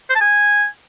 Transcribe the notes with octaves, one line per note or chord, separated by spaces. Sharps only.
C5
A5
G#5